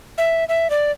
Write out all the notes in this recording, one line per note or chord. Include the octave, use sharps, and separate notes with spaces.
E5
E5
D5